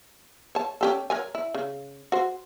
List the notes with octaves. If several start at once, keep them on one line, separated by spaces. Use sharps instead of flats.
C#5 A5
C#4 G4 A4
A#4 C#5 G#5
E4
C#3
F#4 C5